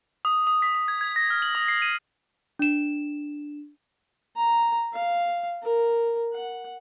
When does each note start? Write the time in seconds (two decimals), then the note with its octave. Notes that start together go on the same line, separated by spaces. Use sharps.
0.25 D#6
0.47 D#6
0.62 B6
0.75 D#6
0.88 G#6
1.01 G#6
1.16 A#6
1.30 F6
1.42 F#7
1.55 D#6
1.68 C7
1.82 D#7
2.59 D4 E7
4.36 A#5
4.93 F5
5.63 A#4
6.34 F#5